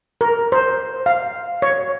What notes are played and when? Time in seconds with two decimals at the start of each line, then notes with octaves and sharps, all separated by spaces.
0.21 A#4
0.52 C5
1.06 F5
1.62 C#5